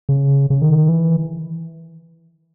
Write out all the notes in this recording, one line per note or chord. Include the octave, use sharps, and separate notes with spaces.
C#3
C#3
D#3
E3